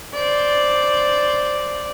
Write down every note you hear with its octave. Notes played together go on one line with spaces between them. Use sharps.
C5 D5